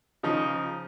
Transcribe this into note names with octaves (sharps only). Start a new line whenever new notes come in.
C#3 F3 D#4